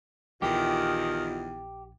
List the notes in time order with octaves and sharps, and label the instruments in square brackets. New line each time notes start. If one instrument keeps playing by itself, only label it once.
[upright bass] A#1 [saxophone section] E2 D#3 [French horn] F4 [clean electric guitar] G4